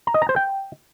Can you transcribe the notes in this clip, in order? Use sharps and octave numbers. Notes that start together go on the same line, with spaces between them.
A#5
D#5
A#5
C5
G5